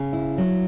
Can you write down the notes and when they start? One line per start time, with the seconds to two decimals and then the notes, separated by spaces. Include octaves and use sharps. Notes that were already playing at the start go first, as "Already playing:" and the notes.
Already playing: C#3
0.13 E4
0.38 F#3